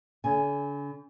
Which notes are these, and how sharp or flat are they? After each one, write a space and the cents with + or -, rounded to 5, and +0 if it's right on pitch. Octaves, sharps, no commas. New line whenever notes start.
D3 -45 G#5 +0